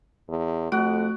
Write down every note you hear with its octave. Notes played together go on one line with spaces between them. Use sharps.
E2
F2 A3 F#4 F#6 D7